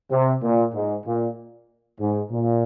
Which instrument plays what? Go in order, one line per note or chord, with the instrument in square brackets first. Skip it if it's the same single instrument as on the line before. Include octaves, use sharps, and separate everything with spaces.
[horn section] C3
A#2
G#2
A#2
G#2
A#2